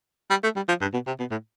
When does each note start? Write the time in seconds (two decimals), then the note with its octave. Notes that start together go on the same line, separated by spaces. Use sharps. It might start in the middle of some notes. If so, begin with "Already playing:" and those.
0.30 G3
0.43 A3
0.56 G3
0.68 F3
0.81 G2
0.93 B2
1.07 C3
1.20 B2
1.31 A2